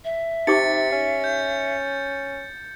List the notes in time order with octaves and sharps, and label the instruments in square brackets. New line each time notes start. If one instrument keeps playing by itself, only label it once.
[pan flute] E5
[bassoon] C3 [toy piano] D#4 G4 D6 [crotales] A6 C#7
[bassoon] C#4
[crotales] G6